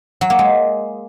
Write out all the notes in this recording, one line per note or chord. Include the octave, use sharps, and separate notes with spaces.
F#3
A#3
G#3